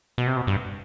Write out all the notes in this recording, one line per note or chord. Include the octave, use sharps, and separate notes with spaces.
B2
C3
B2
G2